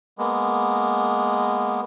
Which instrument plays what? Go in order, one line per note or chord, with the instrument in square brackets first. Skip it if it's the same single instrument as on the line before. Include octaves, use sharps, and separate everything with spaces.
[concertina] G#3 A#3 B3